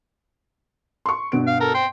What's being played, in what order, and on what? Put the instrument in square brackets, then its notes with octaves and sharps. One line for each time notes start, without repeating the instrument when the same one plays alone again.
[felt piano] C6 C#6
G2 B2 D7
[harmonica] F5
A4 A#4
G5 C6